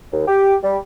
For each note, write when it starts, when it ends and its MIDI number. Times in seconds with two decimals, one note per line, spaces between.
0.12 0.22 39
0.27 0.55 67
0.63 0.77 55